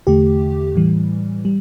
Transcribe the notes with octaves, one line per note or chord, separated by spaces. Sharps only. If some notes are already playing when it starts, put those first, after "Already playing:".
E2 D3 A3 G4
A2 E3 G3
G3